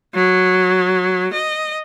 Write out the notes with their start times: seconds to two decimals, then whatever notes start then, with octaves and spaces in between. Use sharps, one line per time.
0.14 F#3
1.33 D#5